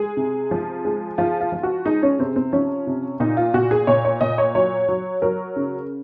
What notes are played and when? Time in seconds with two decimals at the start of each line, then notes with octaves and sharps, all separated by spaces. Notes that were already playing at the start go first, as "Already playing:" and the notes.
Already playing: G#3 G#4
0.17 C3
0.51 F3
0.85 G#3
1.18 F3 F4
1.41 F4
1.52 F3
1.63 F#4
1.85 G#3 D#4
2.03 C#4
2.19 C3 C4
2.36 C4
2.53 F3 C#4
2.87 C3
3.20 A#2 D#4
3.37 F4
3.54 A#2 F#4
3.71 G#4
3.87 A#2 C#5
4.05 C#5
4.21 A#2 D#5
4.38 C#5
4.55 F#3 C#5
4.88 F#3
5.22 F#3 A#4
5.56 C#3